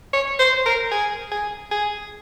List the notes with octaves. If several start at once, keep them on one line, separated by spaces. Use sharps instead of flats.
C#5
C5
A#4
G#4
G#4
G#4